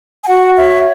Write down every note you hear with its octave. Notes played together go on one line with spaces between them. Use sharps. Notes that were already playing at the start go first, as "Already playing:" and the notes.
G#5
F#4 F#5
C#5 E5